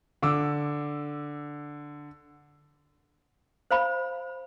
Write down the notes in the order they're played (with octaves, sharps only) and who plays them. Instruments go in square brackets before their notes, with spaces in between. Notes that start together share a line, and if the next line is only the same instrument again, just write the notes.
[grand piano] D3 D6 E6
[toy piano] C5 F5 B5